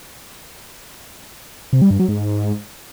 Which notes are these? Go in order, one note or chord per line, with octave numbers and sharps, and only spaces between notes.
C3
G3
G2
F#3
G#2